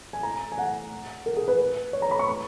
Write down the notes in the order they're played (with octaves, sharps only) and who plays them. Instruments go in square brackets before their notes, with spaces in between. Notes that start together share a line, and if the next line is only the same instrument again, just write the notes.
[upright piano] G#5
A#5
G#5
F#5
A#4
G#4
B4
C#5
A#5
B5
C#6
B5